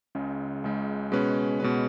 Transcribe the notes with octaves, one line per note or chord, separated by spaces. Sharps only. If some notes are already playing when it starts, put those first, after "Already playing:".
C#2 C#3 G#3
C#2 C#3 G#3
B2 G#3 C#4 B4
B2 G#3 C#4 B4